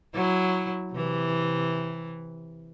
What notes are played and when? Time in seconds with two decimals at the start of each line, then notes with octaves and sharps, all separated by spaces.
0.14 F#3 E4
0.93 C3 E3